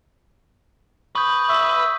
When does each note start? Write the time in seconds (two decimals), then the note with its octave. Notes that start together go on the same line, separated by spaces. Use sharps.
1.15 B4 C#6 D#6 G6
1.49 E5 C#6